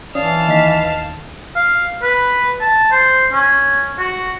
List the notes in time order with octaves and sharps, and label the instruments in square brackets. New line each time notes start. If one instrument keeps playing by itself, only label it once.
[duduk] E3 [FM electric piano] C#4 [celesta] D5 D#6 [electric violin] F5 A5
[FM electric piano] D#2 [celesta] D#5 B6
[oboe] F5
B4
A5
C5
C#4
F#4